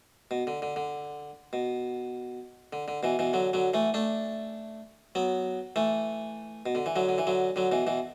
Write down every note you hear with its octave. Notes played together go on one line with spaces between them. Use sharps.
B2
D3
D3
D3
B2
D3
D3
B2 E3
B2 E3
D3 F#3
D3 F#3
E3 A3
A3 D4
F#3 B3
E3 A3
B2
D3
E3
D3 F#3
D3
E3
D3 F#3
D3 F#3
B2 E3
B2 E3